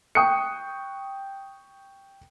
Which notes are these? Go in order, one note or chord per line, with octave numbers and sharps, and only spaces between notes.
G5 C#6 D#6 F#6 C#7